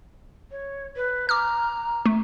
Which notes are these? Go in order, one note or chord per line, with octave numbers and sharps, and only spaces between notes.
C#5
B4
A#5 D6 F6
A3